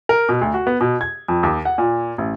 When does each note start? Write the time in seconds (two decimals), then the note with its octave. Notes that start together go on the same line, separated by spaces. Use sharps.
0.09 A#4
0.29 B2
0.41 D2
0.54 F#4
0.67 B3
0.81 B2
1.01 G#6
1.28 F2
1.43 D#2
1.65 F#5
1.78 A#2
2.18 A1